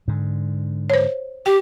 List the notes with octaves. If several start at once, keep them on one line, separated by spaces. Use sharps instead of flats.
G#2 D3
C5 C#5
G4 G5